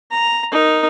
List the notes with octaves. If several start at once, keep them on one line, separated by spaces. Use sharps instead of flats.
A#5
D#4 A#4